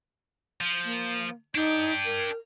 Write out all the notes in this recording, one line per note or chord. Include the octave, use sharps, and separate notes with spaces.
F3
A#3
D4 D#4 G4
A#4